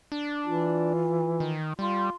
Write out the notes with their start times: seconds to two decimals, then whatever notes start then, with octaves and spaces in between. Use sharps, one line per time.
0.12 D4
0.45 E3 F4
1.40 D#3
1.79 G3 F4 C6